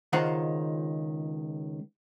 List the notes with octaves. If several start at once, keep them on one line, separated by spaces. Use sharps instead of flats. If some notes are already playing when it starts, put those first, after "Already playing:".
C#2 D#3 F4 C5 F#5 A#5